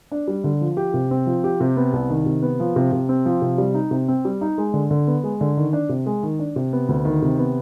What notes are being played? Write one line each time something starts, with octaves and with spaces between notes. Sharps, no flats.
D4
G3
D3
F3
G4
C3
C4
F3
G4
C3
B3
C2
D#3
C3
B3
F3
C3
C3
C4
F3
C3
G3
D#4
C3
C4
G3
D#4
G#3
D3
D3
B3
G#3
D3
D#3
D4
C3
G#3
D#3
D4
C3
B3
D2
D#3
C3
B3